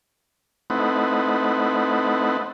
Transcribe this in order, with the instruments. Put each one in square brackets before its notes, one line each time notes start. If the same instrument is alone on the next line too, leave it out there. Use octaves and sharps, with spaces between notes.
[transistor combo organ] A3 C4 D#4 E4 B4 F#5